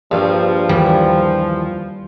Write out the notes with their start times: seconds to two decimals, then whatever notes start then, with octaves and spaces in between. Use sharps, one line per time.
0.11 A#1 G2 F3
0.69 D#2 E3 G3